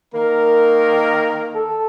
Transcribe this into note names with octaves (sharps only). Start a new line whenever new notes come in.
D#3 A#3 A#4
A4